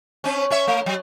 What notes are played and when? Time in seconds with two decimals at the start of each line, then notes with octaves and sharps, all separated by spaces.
0.24 C4 C#4
0.50 C#4 C#5 E5
0.67 A3
0.86 F#3